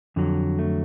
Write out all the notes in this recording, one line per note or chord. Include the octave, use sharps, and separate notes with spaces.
F2 D3 F#3
A3